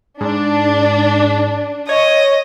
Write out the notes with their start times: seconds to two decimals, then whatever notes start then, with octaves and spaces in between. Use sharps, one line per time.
0.21 G#2 D4
1.89 C#5 D#5